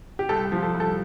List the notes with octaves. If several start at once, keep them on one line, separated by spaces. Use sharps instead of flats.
G4
C2 A4
F3
A4
C2
A4